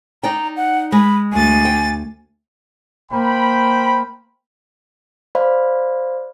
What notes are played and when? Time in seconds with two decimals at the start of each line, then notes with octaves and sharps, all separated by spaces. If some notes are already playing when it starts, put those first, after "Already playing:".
0.23 D#4 D5 G5 A#5
0.57 F#5
0.92 G#3 B5
1.33 D2 G#5 A6
1.65 G5
3.11 A#3 C5 G5 B5
5.35 C5 D5 F5 B5